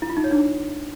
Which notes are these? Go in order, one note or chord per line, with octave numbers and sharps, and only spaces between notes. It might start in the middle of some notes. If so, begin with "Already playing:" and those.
E4
F4
D#4
C#5
D4